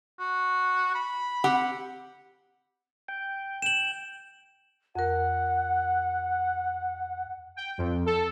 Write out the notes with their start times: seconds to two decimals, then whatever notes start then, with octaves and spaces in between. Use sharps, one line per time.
0.20 F#4
0.95 B5
1.44 C4 G4 F#5
3.08 G5
3.62 E7 F#7
4.95 F2 A#4 F#5
7.56 G5
7.78 F2
8.06 A4